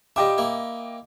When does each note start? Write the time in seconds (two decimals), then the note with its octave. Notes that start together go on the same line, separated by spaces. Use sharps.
0.16 G3 F4 D#5 E5 G5 D6
0.38 A#3 E4